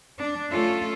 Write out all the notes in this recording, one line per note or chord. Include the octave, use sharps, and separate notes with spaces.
D4
A3 C#4 F4 A4